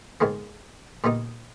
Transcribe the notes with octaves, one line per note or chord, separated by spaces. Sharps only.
G#2 D#3 G#3 B3
A#2 G3 B3 D#4